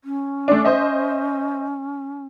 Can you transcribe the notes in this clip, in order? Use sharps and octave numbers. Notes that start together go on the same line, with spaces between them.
C#4
A3 D4
C5 D#5 E5